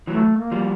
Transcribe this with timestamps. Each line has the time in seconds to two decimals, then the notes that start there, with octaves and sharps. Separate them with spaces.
0.07 E3 F#3 A3
0.36 A#3
0.51 F3 G3